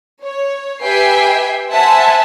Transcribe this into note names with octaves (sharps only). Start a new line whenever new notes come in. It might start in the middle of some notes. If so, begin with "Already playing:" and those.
C#5
G4 B4 E5 G5 G#5 C7
C5 E5 F#5 G#5 A5